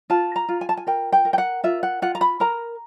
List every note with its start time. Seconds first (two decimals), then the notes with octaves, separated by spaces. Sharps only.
0.10 F4 A5
0.36 A#5
0.49 F4
0.61 G#5
0.69 A5
0.77 G#5
0.87 A#4 G5
1.12 G5
1.25 A#4
1.33 G5
1.38 F#5
1.64 F4 E5
1.83 F#5
2.02 F4 F#5
2.15 A#5
2.21 B5
2.40 A#4 A#5